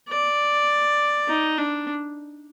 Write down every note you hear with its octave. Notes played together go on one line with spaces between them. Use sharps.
D5
D#4
D4